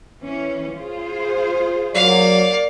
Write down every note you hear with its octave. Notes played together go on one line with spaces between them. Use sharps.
E3 C#4
F4 G#4 C5
F#3 A#3 D5 F5